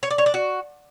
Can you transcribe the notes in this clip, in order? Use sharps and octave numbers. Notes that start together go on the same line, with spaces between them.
C#5
D5
C#5
D4
F#4